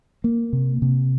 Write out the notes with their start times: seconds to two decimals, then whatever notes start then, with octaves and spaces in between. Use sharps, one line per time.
0.24 A#3
0.53 C3
0.82 C3